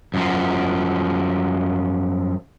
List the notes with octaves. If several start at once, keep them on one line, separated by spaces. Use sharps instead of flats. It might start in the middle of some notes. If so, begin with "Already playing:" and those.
F#2 F3